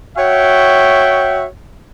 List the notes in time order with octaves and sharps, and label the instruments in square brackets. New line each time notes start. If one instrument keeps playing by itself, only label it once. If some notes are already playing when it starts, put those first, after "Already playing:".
[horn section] F#4 C#5 E5 G5